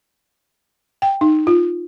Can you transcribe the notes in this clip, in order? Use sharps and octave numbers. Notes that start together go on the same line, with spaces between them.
G5
D#4
F4